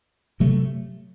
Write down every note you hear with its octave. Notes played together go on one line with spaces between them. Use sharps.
C3 F#3 A3